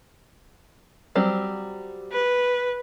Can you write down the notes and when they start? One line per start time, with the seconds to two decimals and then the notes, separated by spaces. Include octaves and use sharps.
1.15 F#3 G3 C4
2.12 B4